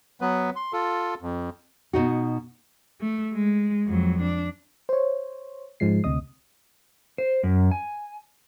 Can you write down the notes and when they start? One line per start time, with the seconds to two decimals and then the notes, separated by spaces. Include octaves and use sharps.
0.21 F#3 B3 B4
0.56 C6
0.73 F4 A4
1.22 F2
1.93 B2 D#4 F#4
3.01 A3
3.34 G#3
3.87 F2 F#3
4.22 D4
4.89 C5 C#5
5.80 G#2 F3 G#3 C7
6.04 D2 C3 D#5 D#6
7.18 C5
7.43 F#2
7.71 G#5